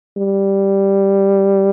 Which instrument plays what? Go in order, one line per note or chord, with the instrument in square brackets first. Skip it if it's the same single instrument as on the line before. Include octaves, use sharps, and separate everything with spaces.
[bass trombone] G3